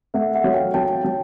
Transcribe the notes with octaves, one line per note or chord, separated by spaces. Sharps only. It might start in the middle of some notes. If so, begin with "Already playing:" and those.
A3 E5 F#5
E5 F#5
F#3
F5 G5
F#3 G5 A5
F#3